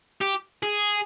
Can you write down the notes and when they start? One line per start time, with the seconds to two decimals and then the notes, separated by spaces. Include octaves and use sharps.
0.22 G4
0.63 G#4